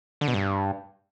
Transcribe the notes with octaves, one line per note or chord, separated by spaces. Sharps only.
D3
B2
G2